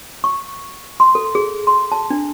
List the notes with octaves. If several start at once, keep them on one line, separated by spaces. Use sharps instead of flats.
C#6
C6
A4
G#4
C6
A5
D4